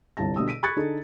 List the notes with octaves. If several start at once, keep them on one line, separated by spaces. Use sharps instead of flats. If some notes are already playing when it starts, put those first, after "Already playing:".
G1 C2 C3 A5 A#6
B2 D3 G3 D#6 E6
B6 D7 D#7
B5 C#6 F#6 G#6 A6 C#7
D3 D#4 G#4 A4